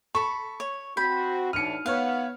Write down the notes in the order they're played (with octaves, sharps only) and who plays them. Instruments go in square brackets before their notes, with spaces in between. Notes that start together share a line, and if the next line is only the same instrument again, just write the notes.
[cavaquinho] A4 B5 [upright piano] C#6
[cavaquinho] C#5
[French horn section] C4 F#4 [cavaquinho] B5 [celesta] G6 B6
[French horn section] A2 E3 D4 [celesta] D#4 D#7 [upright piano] F6 C#7
[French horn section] B3 [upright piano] C#5 F6 [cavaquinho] F5 F#5